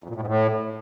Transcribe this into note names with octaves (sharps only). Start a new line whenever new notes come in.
F2
A#2
A2
G#2
A2